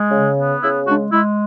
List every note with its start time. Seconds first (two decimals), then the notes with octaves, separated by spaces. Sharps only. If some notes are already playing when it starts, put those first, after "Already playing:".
Already playing: G#3
0.11 C#3
0.37 B3
0.61 C#3 E4
0.86 G#3 D4 F#4
1.12 G#3 E4